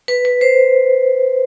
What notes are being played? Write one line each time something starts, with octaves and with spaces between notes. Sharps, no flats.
B4
B4
C5